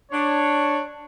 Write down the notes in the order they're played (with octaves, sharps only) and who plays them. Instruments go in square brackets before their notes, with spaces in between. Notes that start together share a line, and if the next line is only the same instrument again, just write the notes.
[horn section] D4 C#5